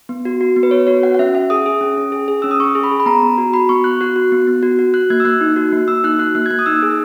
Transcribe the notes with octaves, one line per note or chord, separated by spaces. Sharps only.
B3
F#4
F#4
B3
B4
B3 C#5
F#4 C#5
F#4 F#5
F#5
C#4 E5
C#4 E5
G#4 D#6
G#4
C#4
C#4
G#4
G#4
C#4 E6
D#6
C#4 C#6
G#4
B5
G#4
B5
B3 A#5
B3
F#4
F#4 B5
B3 C#6
B3 F#6
F#4 F#6
F#4
B3
B3
F#4
F#4
F#4 F#6
A#3 G#6
E6
A#3 F#6
D#4
F#4
A#3
A#3 E6
D#4 F#6
F#4 F#6
A#3 F#6
G#6
A#3 F#6
D#6
D#4 E6
G#4